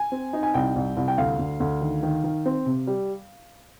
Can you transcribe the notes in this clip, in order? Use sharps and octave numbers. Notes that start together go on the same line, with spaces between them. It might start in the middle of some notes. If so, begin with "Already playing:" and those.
Already playing: G#5
C4
D#4
G#5
C2 G5
C2
C2
G5
D2 F5
D2
D2
D#3
D#3
D#3
C4
C3
G3